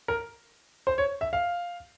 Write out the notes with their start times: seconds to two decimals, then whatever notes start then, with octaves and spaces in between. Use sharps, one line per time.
0.08 A#4
0.87 C5
0.98 C#5
1.21 E5
1.33 F5